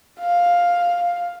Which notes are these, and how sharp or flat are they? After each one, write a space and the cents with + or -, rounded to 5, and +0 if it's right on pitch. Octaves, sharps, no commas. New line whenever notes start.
F5 +5